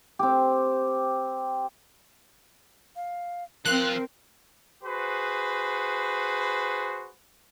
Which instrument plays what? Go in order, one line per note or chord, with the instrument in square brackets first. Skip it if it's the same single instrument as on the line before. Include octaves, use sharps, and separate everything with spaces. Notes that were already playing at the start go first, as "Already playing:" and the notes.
[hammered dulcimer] C4 G4
[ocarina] F5
[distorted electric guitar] F3 F5 [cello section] C4 [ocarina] A#4 [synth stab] F#6
[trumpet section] F#4 G#4 B4 C5